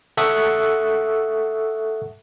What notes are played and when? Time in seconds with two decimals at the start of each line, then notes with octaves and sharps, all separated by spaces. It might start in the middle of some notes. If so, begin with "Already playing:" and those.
0.17 A4 E5 F#5 C#6 D#6 F#6